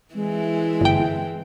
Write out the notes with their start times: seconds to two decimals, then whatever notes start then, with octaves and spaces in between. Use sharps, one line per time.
0.14 E3 G#3 C4 E4
0.81 G1 G5